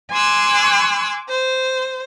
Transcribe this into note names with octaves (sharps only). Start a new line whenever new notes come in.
G#5 C6 D6 E6 F#6
C5